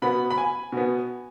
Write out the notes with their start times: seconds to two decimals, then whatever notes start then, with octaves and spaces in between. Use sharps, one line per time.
0.02 B2 B3 B5
0.30 B5
0.38 G#5
0.72 B2 B3